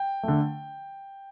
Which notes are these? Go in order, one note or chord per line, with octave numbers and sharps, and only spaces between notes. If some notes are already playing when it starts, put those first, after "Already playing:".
Already playing: G5
D3 A3